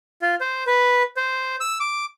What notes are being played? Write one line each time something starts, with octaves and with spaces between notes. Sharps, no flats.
F4
C5
B4
C5
E6
D6